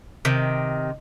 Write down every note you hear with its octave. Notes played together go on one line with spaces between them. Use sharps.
C3 D#3